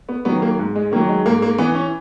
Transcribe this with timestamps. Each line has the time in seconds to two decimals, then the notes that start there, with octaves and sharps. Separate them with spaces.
0.09 B3
0.25 D#3 F#3 B3
0.42 A#3
0.59 G#2
0.75 G#3
0.92 D#3 A#3
0.96 F#3
1.09 G#3
1.26 G#2 A#3
1.42 A#3
1.58 E3 B3
1.75 C#4